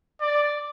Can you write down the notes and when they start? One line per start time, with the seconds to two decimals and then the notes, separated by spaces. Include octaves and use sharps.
0.21 D5